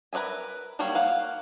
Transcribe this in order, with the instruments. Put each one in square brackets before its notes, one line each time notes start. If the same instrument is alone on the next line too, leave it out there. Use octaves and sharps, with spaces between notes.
[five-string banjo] A#4 B4 D5 E5 G#5
F#3 G3 A#3 B3 C#5
A#3 F5 F#5